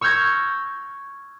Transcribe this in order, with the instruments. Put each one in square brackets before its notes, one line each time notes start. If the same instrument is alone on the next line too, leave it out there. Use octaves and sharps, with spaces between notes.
[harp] C#6 E6 F6 G6 G#6 A#6